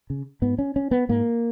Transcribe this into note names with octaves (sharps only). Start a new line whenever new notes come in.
C#3
G#2 B3
C#4
C#4
B3
G#2 A#3